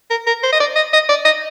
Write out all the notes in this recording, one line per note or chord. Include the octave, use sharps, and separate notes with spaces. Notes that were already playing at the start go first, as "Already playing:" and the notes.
A#4
A#4
C5
D#5
D5
D#5
D#5
D5
D#5